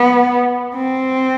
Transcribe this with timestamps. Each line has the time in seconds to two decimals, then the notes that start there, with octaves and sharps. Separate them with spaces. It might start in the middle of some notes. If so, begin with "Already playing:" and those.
Already playing: B3
0.77 C4